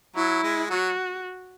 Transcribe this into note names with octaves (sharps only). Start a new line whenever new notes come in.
F#3 E4
G#3
F#3 F#4